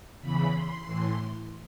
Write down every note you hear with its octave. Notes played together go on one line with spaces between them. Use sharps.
E2 C#3 E3 B5
C6
A2 E3